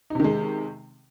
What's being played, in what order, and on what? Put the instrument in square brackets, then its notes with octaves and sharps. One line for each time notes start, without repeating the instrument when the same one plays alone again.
[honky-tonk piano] D#4
C3
D#3
G#3